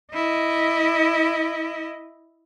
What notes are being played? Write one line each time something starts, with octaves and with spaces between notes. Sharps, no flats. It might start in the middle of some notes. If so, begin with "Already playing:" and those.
E4 D#5